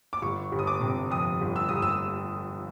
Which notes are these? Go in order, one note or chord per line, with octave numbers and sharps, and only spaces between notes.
D6
G1 C#6
G1
D#6
D6
C3
F2 D#6
G1
E6
G1 D#6
E6